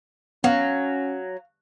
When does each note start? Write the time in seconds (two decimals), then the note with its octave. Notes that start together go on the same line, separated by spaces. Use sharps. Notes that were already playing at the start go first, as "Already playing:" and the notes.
0.44 F#3 B3 C#4 F5